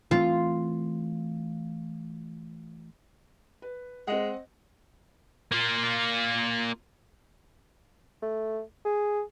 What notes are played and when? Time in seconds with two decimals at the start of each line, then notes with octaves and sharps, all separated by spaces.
0.11 E3 A3 C4 F4
3.62 B4
4.07 G#3 C4 D#5 F#5
5.51 A#3 F4
8.22 A3
8.85 G#4